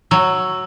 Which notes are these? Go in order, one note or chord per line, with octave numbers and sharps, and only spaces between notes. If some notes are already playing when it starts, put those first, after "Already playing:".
F#3 E6